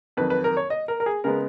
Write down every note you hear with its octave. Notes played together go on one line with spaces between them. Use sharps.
F2 D#3 F#3 B4
B4
A#4
C#5
D#5
A#4
A#4
G#4
C#3 G#3 B3 A#4